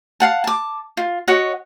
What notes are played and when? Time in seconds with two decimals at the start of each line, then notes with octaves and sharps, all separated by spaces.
0.20 F5 F#5 A5
0.44 A5 D6
0.97 F4
1.28 F#4 C#5 D#5 F#5